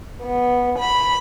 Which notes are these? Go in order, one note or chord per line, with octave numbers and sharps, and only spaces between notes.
B3
B5